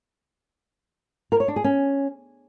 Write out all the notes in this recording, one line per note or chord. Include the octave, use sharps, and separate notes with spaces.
A#4
C#5
D4
G#4
C#4